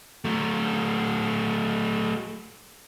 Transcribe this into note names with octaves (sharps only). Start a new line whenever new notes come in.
F#3 A3